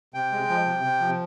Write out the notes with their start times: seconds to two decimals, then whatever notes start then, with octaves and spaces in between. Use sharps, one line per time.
0.14 C3 G5
0.32 G#3
0.49 F3
0.66 C3
0.84 C3
1.00 F3